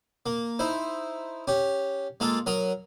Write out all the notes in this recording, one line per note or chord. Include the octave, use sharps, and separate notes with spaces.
A#3
D#4 E4 C5
C#4 G4
G#3 A#3 F4 A4
F#3 A#4 D#6